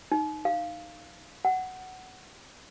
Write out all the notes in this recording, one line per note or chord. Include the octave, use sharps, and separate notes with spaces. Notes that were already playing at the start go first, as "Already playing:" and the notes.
D#4
F5
F#5